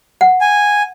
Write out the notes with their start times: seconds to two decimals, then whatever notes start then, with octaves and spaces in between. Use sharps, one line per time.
0.21 F#5
0.41 G#5